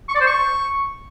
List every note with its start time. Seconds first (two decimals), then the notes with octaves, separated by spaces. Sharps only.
0.09 C#6
0.15 D5
0.21 C5
0.27 C#6